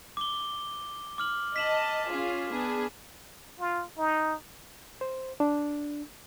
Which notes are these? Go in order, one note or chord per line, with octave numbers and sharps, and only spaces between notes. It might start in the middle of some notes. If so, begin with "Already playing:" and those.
D6 G7
D6 F6 F#7
D#5 A5 B6 E7 F#7
C#4 F4 G#4
B3 D4 G#4
F4
D#4
C5
D4